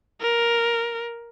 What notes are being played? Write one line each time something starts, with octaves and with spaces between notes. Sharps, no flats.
A#4